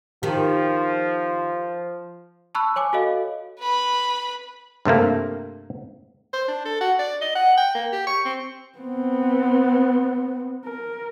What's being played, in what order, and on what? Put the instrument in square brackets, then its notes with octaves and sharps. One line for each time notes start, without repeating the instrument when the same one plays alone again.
[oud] D#3 G4 [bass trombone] F3
[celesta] A5 B5 C#6 E6 F#6
C#5 G#5 D6
F#4 A4 C#5 D#5 F5
[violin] B4 B5
[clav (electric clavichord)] G2 C3 A3 A#3
[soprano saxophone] C5
D4
A4
F#4
D5
D#5
F#5
G5
A#3
G4
C#6
C4
[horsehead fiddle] B3 C4
A#4